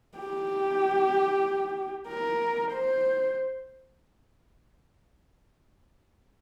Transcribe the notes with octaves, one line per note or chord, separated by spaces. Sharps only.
G4
A#4
C5